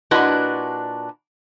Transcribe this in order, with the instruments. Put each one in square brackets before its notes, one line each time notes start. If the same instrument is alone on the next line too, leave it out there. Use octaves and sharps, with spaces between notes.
[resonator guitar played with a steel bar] A#2 D4 E4 F#4 B4 D#5